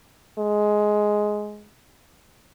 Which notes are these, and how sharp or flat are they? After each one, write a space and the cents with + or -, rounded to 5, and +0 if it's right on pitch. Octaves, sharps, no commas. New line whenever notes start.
G#3 +10